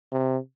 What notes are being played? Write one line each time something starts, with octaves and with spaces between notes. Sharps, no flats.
C3